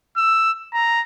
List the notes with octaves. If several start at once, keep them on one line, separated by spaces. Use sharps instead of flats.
E6
A#5